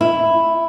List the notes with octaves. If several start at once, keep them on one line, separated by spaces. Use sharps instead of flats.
E4